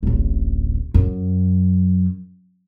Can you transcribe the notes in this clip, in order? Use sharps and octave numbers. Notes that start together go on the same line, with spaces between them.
D1 A1
F#2